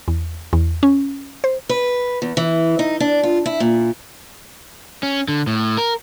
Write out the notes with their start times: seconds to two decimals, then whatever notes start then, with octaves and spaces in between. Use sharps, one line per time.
0.08 E2
0.53 E2
0.83 C#4
1.44 C5
1.69 B4
2.22 E2
2.37 E3
2.79 D#4
3.00 D4
3.23 F4
3.46 E4
3.60 A#2
5.03 C#4
5.28 D3
5.47 A2
5.78 A#4